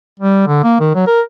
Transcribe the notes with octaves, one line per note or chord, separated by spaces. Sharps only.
G3
D3
A#3
D#3
F#3
A#4